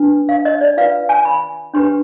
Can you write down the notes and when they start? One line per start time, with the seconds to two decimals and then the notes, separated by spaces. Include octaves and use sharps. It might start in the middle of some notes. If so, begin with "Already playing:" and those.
Already playing: D4 B4
0.29 F5
0.45 D#5
0.61 D5
0.77 F4 B4 F5
1.09 G#5
1.25 B5
1.74 D4 G4 B4 C6